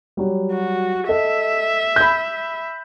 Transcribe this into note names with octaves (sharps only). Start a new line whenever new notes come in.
F#3 G3
F#4
A4 D#5 E5
B5 G6